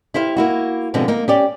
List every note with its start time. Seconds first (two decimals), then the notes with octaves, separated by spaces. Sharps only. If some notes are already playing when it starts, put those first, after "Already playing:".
0.14 E4 G4 C5 F5
0.37 A#3 E4 F#4
0.94 B2 D3 F3 G#3 C4 D4
1.08 A#3 D#4
1.28 C#4 G4 D5